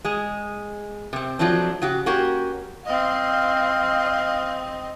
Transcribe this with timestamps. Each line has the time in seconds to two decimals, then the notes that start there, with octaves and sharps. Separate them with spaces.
0.05 G#3 G#4
1.13 C3 C4
1.39 F3 F#3 A3 C4 D4
1.82 C#3 F#4 G4
2.06 A#3 C#4 F#4 G4 A#4
2.86 C4 D#5 F5